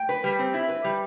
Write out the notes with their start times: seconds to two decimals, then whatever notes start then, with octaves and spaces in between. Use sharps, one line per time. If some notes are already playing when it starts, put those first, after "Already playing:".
Already playing: G5
0.09 B4
0.24 G3
0.39 C4
0.54 E4
0.69 B4
0.84 G3